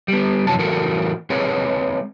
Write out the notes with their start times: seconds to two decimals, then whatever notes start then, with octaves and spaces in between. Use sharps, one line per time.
0.08 G3 B3
0.47 F2 C3 E3 F#3 A5
0.59 A2 E3 F#4 A4 A#4
1.30 G#3 C4 G#4 B4 C#5